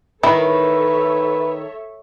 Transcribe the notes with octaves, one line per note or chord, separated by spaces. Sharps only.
D#3 E4 A4 B4 C#5 E5